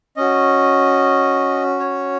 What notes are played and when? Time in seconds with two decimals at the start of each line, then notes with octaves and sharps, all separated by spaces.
0.17 C#4 F#4 D#5
1.80 C#5